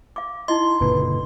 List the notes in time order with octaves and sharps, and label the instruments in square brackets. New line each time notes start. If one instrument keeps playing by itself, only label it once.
[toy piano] F5 D6
[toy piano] D#4 E4 D#5 [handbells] C6
[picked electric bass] F#1 A#2 D3 [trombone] B4